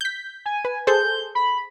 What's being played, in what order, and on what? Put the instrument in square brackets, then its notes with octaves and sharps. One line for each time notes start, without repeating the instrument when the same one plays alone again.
[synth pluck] G6 B6
[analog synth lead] G#5
[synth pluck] B4
[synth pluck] G#4 A4 C5 [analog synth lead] G6
[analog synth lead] B5